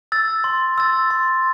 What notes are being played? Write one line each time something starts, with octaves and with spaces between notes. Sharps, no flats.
E6 A6
C6
E6 A6
C6